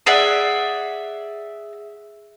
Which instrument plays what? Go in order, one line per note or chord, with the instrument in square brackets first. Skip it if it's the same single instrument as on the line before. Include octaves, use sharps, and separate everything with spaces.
[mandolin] G#4 D5 E5 F#5